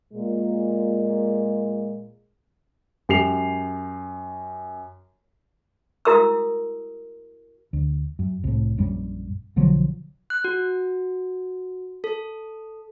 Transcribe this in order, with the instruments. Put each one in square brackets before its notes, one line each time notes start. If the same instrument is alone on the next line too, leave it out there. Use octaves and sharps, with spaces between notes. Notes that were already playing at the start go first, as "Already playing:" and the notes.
[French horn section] A#2 G#3
[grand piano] F#2 G4 C7 F7
[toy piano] E4 F#4 A#4 D#6 E6
[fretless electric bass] D2
F#2
C2 A2
A#1 F#2 G3
B1 D3 F3 F#3
[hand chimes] F#6
F#4
A4